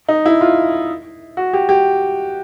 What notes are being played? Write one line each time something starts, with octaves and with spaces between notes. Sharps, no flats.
D#4
E4
F4
F#4
G4
G4